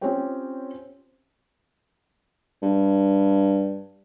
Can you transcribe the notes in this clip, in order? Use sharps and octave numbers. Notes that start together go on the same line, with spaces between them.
C4 C#4 F4 G4 C#5 G5
G2